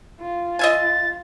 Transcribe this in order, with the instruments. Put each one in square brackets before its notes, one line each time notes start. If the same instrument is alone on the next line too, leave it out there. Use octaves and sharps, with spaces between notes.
[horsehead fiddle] F4
[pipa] D#5 E5 G#5 [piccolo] A6